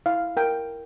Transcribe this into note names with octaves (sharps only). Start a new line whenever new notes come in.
E4 F5
A#4 G5